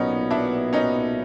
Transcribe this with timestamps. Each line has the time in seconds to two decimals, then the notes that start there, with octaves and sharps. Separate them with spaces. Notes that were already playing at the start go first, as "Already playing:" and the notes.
Already playing: B1 A#2 F#3 B3 C#4 D#4
0.31 D4 E4
0.73 C#4 D#4